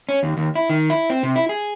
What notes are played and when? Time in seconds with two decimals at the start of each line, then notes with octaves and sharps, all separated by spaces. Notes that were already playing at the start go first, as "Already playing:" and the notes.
0.09 C#4
0.23 D#2
0.37 D#2
0.55 E4
0.70 D#3
0.90 E4
1.10 C4
1.23 C3
1.36 E4
1.49 G#4